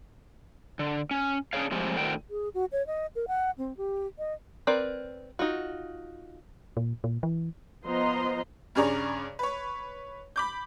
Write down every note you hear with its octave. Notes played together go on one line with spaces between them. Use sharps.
D3
C#4
C#4 D4 G#4 C#5 F5
A2 F3 G#3 C4 G4
A2 D3 D#3 F#4 C5 G5
G#4
F#4
C#5
D#5
A#4
F#5
C4
G4
D#5
C4 A#4 B4 D5
D#4 F4 F#4
A#2
A#2
E3
F3 B3 C5 D#5 A#5 C6
G2 C#3 G#4 C#5 D5 A#5
B4 C#5
B5 D6 G6